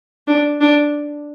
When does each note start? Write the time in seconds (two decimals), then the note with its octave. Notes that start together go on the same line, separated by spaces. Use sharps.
0.27 D4
0.61 D4